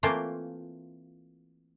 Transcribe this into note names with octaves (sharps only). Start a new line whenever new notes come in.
E3 A3 A#3 C4 F4